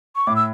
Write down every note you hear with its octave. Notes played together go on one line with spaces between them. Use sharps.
C#6
A2 D6
E6